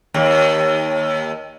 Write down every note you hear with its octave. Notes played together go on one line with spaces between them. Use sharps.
D#2